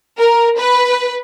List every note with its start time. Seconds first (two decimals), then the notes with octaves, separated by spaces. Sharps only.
0.18 A#4
0.58 B4